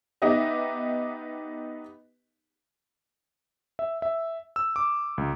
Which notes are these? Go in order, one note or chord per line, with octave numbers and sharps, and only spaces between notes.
B3 D#4 G4 D#5 E5
E5
E5
E6
D6
C#2